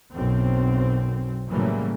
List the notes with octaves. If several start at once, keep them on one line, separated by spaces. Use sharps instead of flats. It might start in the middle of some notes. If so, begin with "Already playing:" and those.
B1 F#2 C4
A2 C#3 E3 F#3 G3 A#3